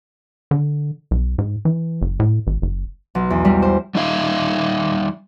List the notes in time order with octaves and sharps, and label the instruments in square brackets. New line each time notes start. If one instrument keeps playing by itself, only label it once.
[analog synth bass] D3
B1
G#2
E3
F#1
A2
G#1
F#1
[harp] B1
E2
G3
C5
[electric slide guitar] G3 D#4 E5 F5